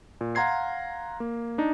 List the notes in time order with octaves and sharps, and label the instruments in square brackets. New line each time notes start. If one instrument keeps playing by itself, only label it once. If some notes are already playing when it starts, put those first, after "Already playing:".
[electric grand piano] A#2
F5 F#5 A#5 C6 G#6 C7
A#3
D4 D#4